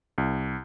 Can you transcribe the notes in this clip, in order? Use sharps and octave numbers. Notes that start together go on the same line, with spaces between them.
C2